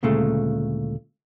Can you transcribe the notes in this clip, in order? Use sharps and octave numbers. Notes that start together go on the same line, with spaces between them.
D2 A#2 C#3 G#3 A3